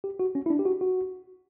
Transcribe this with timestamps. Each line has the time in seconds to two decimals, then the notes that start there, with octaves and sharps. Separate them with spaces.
0.04 G4
0.20 F#4
0.35 C#4
0.46 E4
0.50 D4
0.59 G4
0.65 F#4
0.81 F#4